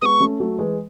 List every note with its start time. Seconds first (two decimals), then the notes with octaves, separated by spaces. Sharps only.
0.02 G#3 B3 C#6 D#6
0.20 A3 C#4
0.40 F#3 A3
0.59 E3 G#3